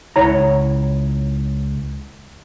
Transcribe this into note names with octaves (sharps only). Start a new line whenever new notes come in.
C#2 E4 C#5 F#5 A#5